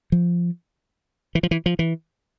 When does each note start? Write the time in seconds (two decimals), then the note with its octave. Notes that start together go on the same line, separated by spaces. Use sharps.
0.12 F3
1.35 E3
1.43 F3
1.51 E3
1.66 F3
1.79 E3